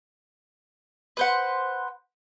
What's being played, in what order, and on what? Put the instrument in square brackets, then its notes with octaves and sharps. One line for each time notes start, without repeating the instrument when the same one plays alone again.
[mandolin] B4 C5 F#5